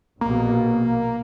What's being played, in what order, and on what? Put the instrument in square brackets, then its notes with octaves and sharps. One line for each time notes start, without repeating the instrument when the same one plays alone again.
[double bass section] A#1 B2 [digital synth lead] A#3